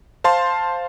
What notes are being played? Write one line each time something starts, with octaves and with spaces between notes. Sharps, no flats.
C5 F5 A5 C6